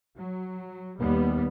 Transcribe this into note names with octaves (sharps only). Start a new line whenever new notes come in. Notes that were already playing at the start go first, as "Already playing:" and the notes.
F#3
D#2 G3 B3